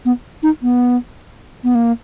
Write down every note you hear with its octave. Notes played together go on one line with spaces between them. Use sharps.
B3
D#4
B3
B3
A#3